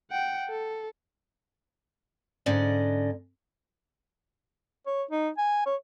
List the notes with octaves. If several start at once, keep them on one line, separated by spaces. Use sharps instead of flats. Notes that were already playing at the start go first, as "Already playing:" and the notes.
F#5 G5
A4
G#2 D3 C#4 D5 D#5
C#5
D#4
G#5
C#5